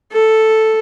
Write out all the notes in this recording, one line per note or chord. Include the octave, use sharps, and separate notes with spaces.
A4